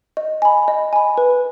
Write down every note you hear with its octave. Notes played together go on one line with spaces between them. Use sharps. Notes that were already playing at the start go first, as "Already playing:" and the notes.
D#5
G#5 B5
D#5
G#5 B5
B4